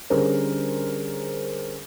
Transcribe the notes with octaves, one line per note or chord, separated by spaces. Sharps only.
D3 G3 C#4 G#4 A#4 C5